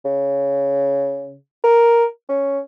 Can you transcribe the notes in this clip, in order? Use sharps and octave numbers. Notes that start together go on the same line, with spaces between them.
C#3
A#4
C#4